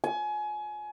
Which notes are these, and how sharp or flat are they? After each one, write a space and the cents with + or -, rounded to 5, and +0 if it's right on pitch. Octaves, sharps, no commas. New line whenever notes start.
G#5 +25